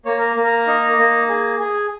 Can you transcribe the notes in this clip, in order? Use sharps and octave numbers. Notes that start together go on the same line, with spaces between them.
A#3 C#5
A#4
A#3
A#4
D#4
A#3
G#4
G#4